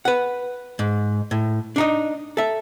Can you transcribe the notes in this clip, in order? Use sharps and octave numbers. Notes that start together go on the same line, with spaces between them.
B4 F#5
G#2
A2
D4 D#4 D#5
A4 E5